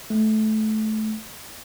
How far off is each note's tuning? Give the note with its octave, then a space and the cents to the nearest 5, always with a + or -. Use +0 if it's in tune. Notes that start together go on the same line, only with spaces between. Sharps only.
A3 -20